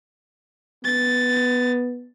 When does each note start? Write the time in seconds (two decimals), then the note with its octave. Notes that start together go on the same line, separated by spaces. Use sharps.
0.84 B3 A6